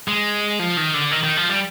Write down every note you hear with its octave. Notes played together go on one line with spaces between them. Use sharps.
G#3
F3
D#3
D3
D#3
D#3
F3
G3